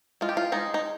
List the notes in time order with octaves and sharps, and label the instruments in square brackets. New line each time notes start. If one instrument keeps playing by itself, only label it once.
[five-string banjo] G#3 F4
G4
F4
G#3 D#4
D#4